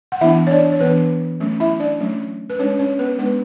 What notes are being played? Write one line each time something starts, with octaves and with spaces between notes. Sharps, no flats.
F#5
E3 B3 D4 E4 E5
C#5
D4 D5
C#5
E3 B3 D4 B4
F#3 A3 C#4
E4 E5
D4 D5
F#3 A3 C#4
B4
G#3 C#4 D4 C#5
C#4 C#5
B3 B4
G#3 B3 D4 B4